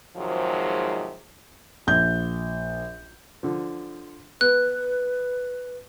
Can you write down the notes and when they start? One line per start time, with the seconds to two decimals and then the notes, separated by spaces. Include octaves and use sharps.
0.17 G#2 C3 D#3 F3 F#3 G#3
1.87 A#1 G6
3.43 D3 F3
4.41 B3 B4 F#6